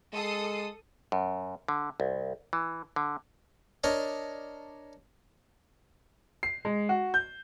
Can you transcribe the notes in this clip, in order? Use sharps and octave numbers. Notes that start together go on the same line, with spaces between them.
G#3 A4 D#6 C7
F#2
D3
C2
E3
D3
D4 A#4 C#5 D#5
C7
G#3
F#4
G6